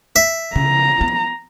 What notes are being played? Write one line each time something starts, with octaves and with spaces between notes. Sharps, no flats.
E5
C#3 A#5
B3